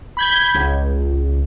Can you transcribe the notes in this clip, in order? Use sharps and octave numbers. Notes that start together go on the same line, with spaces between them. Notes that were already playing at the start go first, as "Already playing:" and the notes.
B5 G6 G#6
C#2